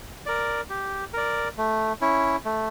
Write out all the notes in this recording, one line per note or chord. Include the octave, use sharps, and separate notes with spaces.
A#4 D5
G4
A#4 D5
A3
C#4 E4
A3